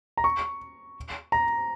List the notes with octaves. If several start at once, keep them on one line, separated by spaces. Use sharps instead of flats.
A#5
C#6
A#5